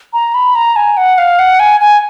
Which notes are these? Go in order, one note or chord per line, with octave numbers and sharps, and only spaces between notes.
A#5
B5
A#5
G#5
F#5
F5
F#5
G#5
G#5